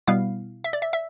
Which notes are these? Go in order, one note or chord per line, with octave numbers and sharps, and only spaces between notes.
B2 G3 B3 E4 F5
E5
D5
E5
E5